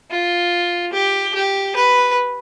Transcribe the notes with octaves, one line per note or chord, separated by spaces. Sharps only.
F4
G4
G4
B4